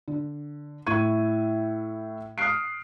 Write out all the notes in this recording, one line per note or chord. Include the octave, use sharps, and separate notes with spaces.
D3
A2 E4 C#6 G#6 D#7
D#6 F6 F#6 C7 D7